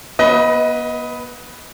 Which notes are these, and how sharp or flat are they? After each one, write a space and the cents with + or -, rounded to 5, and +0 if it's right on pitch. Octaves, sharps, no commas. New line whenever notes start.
B3 -40 B4 +0 D#5 +20